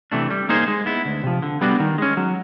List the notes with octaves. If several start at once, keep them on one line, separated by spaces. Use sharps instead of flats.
C3 E3 A3 D4
G3
A#3 D#4 G#4 C5
G#3
B3 E4
D2
C3 F3
D3
G3 B3 D4 F#4
D#3
G#3 C#4
F#3